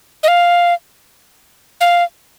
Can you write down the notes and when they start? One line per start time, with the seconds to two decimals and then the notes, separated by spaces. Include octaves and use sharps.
0.23 D#5
0.28 F5
1.81 F5